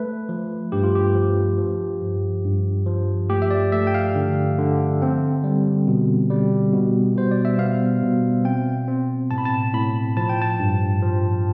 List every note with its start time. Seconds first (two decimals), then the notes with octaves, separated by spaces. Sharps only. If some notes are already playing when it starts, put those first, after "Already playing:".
Already playing: A3 B4
0.29 F3
0.72 G2 G4
0.83 F4
0.95 G4
1.15 F3
1.58 F3
2.01 G2
2.44 G2
2.86 F3
3.30 A3 G4
3.42 E5
3.51 D5
3.72 A3 E5
3.87 G5
3.94 F5
4.15 D3
4.58 D3
5.02 C4
5.44 G3
5.88 B2
6.30 G3
6.73 B2
7.16 B2 C5
7.31 D5
7.45 E5
7.59 B3 F5
8.02 B2
8.45 C4 G5
8.88 C4
9.31 A2 A5
9.38 B5
9.45 A5
9.73 A2 B5
10.17 F3 A5
10.29 G5
10.42 A5
10.59 G2
11.02 F3